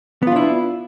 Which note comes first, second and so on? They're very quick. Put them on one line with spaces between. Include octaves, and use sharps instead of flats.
B3 F4 D4 E4